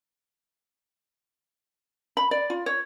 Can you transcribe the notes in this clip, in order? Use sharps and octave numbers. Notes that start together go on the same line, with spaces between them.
B5
D5
F4
C#5